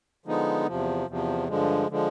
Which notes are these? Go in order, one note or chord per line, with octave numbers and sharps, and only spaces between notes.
D3 F3 G#3 B3 D#4
E2 C3 F3
E2 C3 F3
G2 D3 F3 G#3
D3 F3 G#3